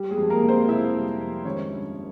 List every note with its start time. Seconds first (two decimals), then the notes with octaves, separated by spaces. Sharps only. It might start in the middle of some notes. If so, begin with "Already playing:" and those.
Already playing: G3 G4
0.11 G#3 G#4
0.17 F2
0.30 A#3 A#4
0.42 F1
0.48 C4 C5
0.68 C3 E4 E5
0.94 G3
1.20 F2
1.45 G#1 C#4 C#5
1.70 G2